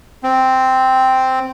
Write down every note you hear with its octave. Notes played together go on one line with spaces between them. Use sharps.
C4